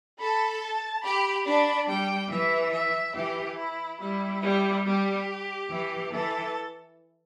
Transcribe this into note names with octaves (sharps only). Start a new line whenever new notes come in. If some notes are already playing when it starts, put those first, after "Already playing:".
A4 B5
A5
G4 B5
D4 B5
G3 G5
E3 E5
E5
E3 G4
E4
G3 E4
G3
G3 G4
E3
E3 A4